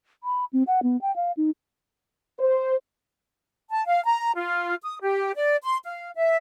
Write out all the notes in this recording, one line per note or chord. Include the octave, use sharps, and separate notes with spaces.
B5
C4
F#5
B3
G5
F5
D#4
C5
A5
F5
A#5
F4
D#6
G4
D5
C6
F5
E5